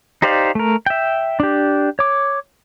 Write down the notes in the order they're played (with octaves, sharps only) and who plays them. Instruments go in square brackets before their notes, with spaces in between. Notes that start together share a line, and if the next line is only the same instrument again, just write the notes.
[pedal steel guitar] D#4 G4 C5 D5 F5
A3 A#4
E5 G5
D4 G4
C#5 D6